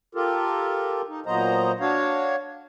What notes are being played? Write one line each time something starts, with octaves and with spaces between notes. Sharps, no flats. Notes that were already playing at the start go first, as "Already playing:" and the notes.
F4 G4 A4 A#4
D#4
A#2 F#3 B3 C5 D#5 A#5
D4 F#4 C#5 F5